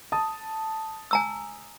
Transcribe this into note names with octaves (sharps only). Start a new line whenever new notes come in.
A5 D#6
G#5 A#5 E6